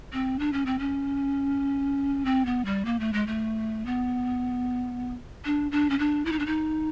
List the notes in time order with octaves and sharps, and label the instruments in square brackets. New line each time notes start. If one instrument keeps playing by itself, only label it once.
[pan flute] C4
D4
C#4
C4
C#4
C4
B3
G3
A#3
A3
G#3
A3
B3
D4
D4
C#4
D4
E4
D#4
D4
D#4